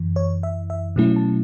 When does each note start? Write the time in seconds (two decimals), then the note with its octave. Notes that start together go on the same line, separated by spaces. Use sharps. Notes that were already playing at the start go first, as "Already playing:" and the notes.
Already playing: F#2 E3
0.16 C#5
0.43 E5
0.70 E5
0.96 B2 F#3 A3 C#4 E4
1.16 A5